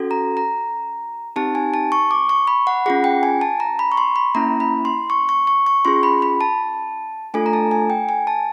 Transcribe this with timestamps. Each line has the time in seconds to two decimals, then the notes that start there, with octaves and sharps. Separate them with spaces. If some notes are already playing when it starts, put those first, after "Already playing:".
Already playing: C#4 F#4 A4
0.11 A#5
0.37 A#5
1.36 C4 D#4 G4 A5
1.55 G#5
1.74 A5
1.92 C#6
2.11 D6
2.29 C#6
2.47 B5
2.67 F#5
2.86 C#4 F4 G#4 F#5
3.04 G5
3.23 G#5
3.41 A5
3.60 A#5
3.79 B5
3.92 C#6
3.97 C6
4.16 B5
4.35 A#3 C#4 E4 A#5
4.60 B5
4.85 C6
5.10 C#6
5.29 C#6
5.47 C#6
5.66 C#6
5.85 C#4 F4 G#4 C6
6.03 B5
6.22 B5
6.41 A5
7.34 A3 D4 F4 A4 G#5
7.46 A#5
7.53 A5
7.71 G#5
7.90 G5
8.09 G#5
8.27 A5